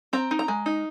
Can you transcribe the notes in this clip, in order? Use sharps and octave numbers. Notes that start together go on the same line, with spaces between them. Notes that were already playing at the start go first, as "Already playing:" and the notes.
C4 A#5
D#4
A#5
G#3
D#4